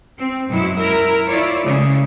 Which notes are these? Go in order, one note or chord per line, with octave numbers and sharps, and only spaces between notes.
C4
F#2 B2 F#3 G#3 E4
E4 A#4
E4 F4 C#5 D5
C#3 G#3 A3